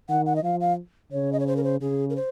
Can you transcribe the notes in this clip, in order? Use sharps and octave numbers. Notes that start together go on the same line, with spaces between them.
D#3 F#5
F#5
D#5
F3 F5
F5
C#3 C#5
D#5
C#5
C5
A#4
C5
C#3 G#4
A#4
C5